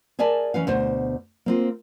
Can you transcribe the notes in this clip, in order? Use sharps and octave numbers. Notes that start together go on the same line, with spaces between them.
G#4 A#4 D5 E5 G#5 A5
E3 C#4 B4 F5
D2 B2 C5
A#3 C4 F4